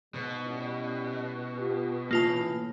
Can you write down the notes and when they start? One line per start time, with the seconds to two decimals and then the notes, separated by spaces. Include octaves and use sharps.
0.14 G#2 B2
0.46 G3 C#4 E4
1.58 B3 F4 G4
2.11 A2 C#3 E3 A#3 F4 A5